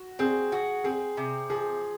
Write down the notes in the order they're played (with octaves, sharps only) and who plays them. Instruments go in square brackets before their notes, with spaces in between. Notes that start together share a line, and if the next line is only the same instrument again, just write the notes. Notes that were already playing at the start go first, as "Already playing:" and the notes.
Already playing: [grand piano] F#4
[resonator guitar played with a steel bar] C4 [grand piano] G#4
[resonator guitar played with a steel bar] F#4
[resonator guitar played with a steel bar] C4 [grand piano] G#4
[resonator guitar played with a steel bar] C3
[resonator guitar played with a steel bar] F3 [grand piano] G#4